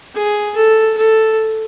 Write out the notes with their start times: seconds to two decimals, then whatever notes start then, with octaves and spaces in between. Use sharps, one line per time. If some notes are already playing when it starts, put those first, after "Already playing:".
0.14 G#4
0.55 A4
0.97 A4